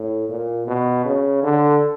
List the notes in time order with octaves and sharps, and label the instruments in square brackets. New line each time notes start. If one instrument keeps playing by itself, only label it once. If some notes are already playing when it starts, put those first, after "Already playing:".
Already playing: [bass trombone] A2
A#2
B2
C#3
D3